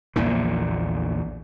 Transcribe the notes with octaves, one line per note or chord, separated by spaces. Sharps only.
A#1 E2 A#2 D3